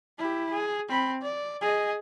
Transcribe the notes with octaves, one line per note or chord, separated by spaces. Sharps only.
E4 G4
G#4
C4 B5
D5
G#4 D#5